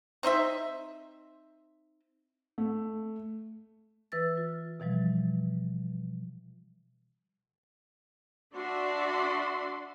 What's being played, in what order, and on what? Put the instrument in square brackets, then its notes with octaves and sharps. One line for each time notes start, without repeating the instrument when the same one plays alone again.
[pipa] C4 D#4 C5 E5
[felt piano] A3
[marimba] E3 B4 E6 A6
F4
B2 E3 F3 G3
[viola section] D4 F#4 D5 E5 C6